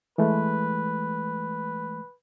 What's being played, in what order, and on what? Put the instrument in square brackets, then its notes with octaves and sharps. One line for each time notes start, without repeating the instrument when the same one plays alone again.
[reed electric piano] E3 G#3 A3 [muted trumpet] B4